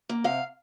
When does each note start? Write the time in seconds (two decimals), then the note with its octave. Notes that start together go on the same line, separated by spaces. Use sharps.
0.09 A#3
0.24 C3 F5